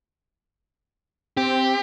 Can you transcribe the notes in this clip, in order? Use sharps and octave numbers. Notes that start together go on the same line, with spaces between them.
C4 G4